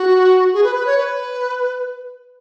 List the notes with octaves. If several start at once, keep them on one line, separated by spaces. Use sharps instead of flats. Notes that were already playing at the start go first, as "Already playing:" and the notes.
Already playing: F#4
G#4
B4
B4
C#5
B4